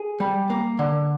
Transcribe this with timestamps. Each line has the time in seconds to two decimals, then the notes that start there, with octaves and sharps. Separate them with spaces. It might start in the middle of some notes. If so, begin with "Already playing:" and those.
Already playing: G#4
0.20 G3
0.50 A#3
0.79 D3